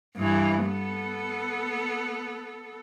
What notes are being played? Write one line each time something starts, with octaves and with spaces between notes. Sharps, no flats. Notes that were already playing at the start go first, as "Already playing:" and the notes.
G2 E3
B3 A4